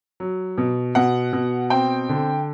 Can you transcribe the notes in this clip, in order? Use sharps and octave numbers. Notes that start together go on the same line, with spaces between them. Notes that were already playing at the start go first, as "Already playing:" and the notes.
F#3
B2
B2 F#5
B2
C4 G5
D3